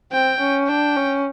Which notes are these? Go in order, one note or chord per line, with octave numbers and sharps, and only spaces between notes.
C4 G5
C#4
D4 G5
C#4